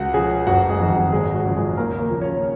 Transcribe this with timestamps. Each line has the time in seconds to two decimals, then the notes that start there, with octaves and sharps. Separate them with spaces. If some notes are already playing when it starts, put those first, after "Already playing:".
Already playing: C#2 F#4 F#5
0.14 C#3 F3 G#4 G#5
0.47 F#1 F#4 F#5
0.69 G#3 G#4
0.80 F2 D#3
0.90 F#4
1.12 G#1 G#3 G#4
1.34 F#4
1.45 F#2 C#3 F3
1.56 G#3 G#4
1.77 D#2 A#3 A#4
1.99 A#3 A#4
2.10 C#3 F3
2.21 C#4 C#5